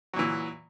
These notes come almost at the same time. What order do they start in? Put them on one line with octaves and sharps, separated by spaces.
F#3 A#2 E3